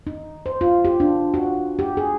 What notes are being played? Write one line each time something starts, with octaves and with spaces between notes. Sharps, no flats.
D#4
C5
F4
G4
D4
F#4
G4
G#4